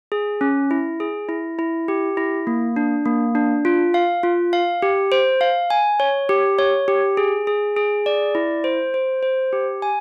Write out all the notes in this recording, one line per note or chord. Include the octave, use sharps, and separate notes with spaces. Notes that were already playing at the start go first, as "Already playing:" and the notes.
G#4
C#4
E4
G#4
E4
E4
G4
E4
A#3
D4
A#3
D4
F4
F5
F4
F5
G4
C5
F5
G#5
C#5
G4
C#5
G4
G#4
G#4
G#4
D5
E4
C5
C5
C5
G4
G#5